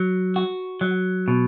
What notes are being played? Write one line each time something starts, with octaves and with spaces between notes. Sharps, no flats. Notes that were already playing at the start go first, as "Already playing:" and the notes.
Already playing: F#3
F#4
F#3
B2